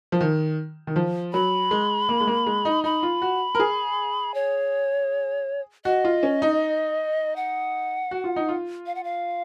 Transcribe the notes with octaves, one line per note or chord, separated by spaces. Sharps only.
F3
D#3
D#3
F3
F#3 B5
G#3
A#3
G#3
A#3
G#3
D#4
D#4 B5
F4
F#4
A#4
G#4
C#5
F#4 D#5
F4
C#4
D#4
F#5
F#4
F4
D#4
F4
F5
F#5
F5